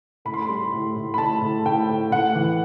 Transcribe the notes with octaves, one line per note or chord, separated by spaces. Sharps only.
A2 B5
C6
B5
G3
A2
A2
B5
A2 A5
A2
A2 G5
A2
A2 F#5
E3